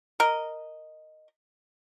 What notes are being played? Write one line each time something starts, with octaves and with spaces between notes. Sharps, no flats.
A#4 D#5